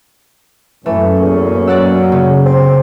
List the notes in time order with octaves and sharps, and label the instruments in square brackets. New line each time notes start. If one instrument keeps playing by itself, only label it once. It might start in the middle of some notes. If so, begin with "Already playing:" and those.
[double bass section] F#2 A#3 C#4 [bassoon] E3 [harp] A3
[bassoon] E2
[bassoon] F#3 [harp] D5 F#5 E6
[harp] C#3
[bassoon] C4